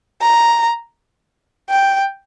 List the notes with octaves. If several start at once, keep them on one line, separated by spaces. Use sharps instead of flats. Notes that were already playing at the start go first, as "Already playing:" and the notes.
A#5
G5